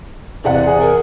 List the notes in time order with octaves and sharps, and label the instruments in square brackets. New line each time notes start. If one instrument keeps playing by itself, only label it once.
[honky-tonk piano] E2 C3 F#5 [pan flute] D5
[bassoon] G#4
[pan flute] A#4